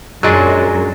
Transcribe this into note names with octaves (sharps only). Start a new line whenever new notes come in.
F#2 A#2 F#3 G#3 D4